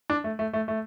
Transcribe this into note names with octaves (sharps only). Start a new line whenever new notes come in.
D4
A3
A3
A3
A3